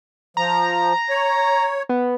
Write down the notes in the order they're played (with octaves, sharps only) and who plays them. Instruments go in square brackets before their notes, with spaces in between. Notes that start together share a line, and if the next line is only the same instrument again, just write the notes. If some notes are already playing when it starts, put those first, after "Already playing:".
[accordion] F3 [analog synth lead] A#5
[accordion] C#5
[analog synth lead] B3